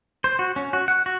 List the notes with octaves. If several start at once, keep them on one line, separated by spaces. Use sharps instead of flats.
C5
F#4
C#4
F#4
F#5
F#4